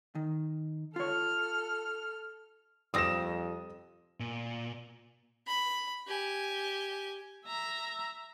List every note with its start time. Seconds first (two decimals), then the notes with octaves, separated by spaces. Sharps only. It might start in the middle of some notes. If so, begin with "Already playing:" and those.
0.15 D#3
0.96 F4 A4 C#5 F6
2.94 F2 G3 C4 D#6 A#6 E7
4.20 A#2
5.47 B5
6.07 G4 G#5
7.45 E5 A#5